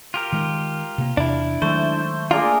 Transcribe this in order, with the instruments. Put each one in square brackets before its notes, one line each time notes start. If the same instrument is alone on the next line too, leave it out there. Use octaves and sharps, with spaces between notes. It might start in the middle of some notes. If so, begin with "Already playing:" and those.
[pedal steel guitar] F4 G4 A#4
[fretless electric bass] D#3 G#3
C3 A#3
[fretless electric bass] E2 C3 [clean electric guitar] D4 E4
[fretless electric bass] D#3 F#3 G#3 [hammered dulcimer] A3 [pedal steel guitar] C5
[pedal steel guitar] A#3 A#4 [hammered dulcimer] D4 G#4 D6 [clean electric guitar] F4